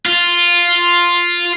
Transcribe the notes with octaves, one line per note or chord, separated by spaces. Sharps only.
F4